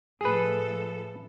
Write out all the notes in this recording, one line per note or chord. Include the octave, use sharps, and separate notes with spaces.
A2 F3 G#4 A4 B4